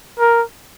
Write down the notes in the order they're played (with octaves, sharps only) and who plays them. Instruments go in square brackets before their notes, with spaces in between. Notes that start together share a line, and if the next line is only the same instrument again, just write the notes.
[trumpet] A#4